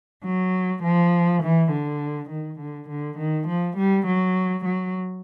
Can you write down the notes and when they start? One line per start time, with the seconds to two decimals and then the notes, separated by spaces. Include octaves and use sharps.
0.25 F#3
0.83 F3
1.43 E3
1.71 D3
2.30 D#3
2.60 D3
2.89 D3
3.18 D#3
3.48 F3
3.77 G3
4.07 F#3
4.65 F#3